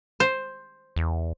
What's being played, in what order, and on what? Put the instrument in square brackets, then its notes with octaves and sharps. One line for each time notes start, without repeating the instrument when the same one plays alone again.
[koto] C5
[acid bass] E2